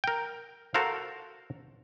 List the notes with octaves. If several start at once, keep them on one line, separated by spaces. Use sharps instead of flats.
A#4 G5
F#4 A4 A#4 C5 F5